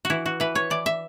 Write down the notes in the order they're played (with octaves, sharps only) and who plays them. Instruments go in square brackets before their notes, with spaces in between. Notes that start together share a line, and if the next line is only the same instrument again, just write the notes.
[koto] F#4
E3 E4
F#4
E3 B4
C#5
E3 D5
E5